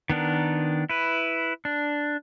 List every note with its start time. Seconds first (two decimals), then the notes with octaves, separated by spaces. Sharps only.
0.09 D#3 B3 D4 A#4
0.90 E4 B4
1.65 D4